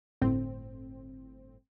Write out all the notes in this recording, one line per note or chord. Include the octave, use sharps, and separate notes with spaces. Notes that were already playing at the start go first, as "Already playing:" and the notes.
G1 A2 C4